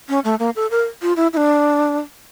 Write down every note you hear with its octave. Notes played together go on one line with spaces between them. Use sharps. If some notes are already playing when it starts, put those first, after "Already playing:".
C#4
A3
A#3
A4
A#4
F4
E4
E4
D4